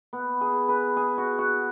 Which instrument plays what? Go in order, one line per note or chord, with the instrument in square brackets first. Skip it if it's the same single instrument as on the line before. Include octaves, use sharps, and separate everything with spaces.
[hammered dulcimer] B3
G#4
B4
G#4
F#4
F#4